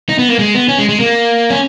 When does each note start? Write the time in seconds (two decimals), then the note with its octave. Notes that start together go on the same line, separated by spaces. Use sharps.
0.09 D#4
0.19 B3
0.29 A#3
0.39 G#3
0.55 B3
0.69 C#4
0.78 G#3
0.89 G#3
1.00 A#3
1.50 C#4